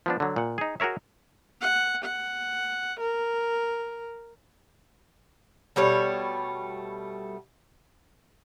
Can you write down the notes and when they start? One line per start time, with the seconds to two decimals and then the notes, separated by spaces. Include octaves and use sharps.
0.06 F3 B3 D4
0.20 D3 F#3
0.36 A#2 F#5
0.58 D#4 G#4
0.80 F#4 G#4 A#4 C#5 E5
1.61 F#5
2.05 F#5
3.00 A#4
5.76 B2 G3 A3 C#5